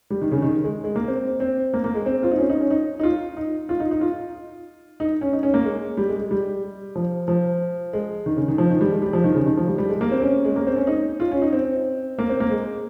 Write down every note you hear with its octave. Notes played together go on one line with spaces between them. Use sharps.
G3
D#3
C#3
D#3
G#3
G#3
A#3
C4
C4
A#3
A#3
G#3
C4
F4
D#4
C#4
D#4
C#4
D#4
D#4
F4
D#4
F4
D#4
D#4
F4
D#4
C#4
D#4
C#4
A#3
G#3
G3
G#3
G#3
G3
F3
F3
G#3
D#3
C#3
D#3
F3
D#3
G3
G#3
G3
F3
D#3
C#3
D#3
F3
G3
G3
G#3
A#3
C4
C#4
G#3
A#3
C4
C#4
D#4
F4
C#4
D#4
C4
A#3
C4
A#3
G#3